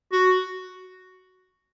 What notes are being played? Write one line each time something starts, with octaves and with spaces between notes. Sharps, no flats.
F#4